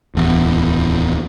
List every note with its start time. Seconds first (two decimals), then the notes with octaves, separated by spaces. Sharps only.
0.15 D1 E2